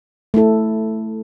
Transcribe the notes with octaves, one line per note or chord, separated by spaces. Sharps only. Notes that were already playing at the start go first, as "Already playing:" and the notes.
A3 E4 A4